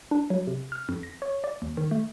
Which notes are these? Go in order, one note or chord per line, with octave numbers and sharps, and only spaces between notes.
D4
F#3
C3
F6
F2
A#6
C#5
D5
D#2
D#3
A3